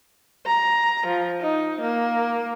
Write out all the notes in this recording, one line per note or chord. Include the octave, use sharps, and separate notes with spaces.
A#5
F3
D#4
A#3